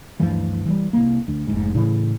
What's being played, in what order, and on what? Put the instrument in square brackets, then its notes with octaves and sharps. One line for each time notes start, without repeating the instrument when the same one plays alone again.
[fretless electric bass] D2 G2 E3 F3
E3 F3 G3
C2 A#3
D2
F1 G#2
A2 C#3 E3